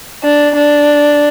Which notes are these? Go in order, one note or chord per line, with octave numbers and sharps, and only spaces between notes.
D4
D4